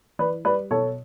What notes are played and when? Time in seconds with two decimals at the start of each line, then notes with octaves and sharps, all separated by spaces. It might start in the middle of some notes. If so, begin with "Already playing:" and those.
0.19 E3 B4 D5
0.45 G3 B4 D5
0.71 B2 A4 C#5